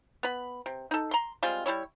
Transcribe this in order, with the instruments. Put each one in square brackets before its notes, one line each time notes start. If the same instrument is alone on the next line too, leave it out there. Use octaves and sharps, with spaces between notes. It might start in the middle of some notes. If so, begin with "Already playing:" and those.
[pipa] B3 B5
C3
D#4 A4
A#5 C6
G3 G#3 C4 F4
G3 G#3 E4 C#5